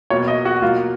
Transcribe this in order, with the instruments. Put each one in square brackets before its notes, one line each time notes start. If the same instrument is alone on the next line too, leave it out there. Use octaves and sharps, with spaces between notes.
[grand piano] B2 F#3 A#3 C#5
D#5
F#4
B2 F#3 A#3 F4